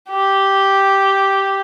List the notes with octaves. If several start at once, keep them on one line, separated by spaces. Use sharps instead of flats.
G4